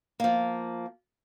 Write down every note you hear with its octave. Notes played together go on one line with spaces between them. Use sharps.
F3 A#3